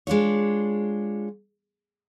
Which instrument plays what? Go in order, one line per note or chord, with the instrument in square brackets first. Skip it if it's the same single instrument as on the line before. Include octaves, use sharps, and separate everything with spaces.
[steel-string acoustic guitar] G#3 D4 F4 C#5